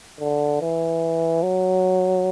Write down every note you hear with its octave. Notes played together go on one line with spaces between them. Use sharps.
D3
E3
F#3